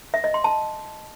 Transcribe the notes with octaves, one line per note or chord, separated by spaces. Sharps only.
E5
D#5
C6
A5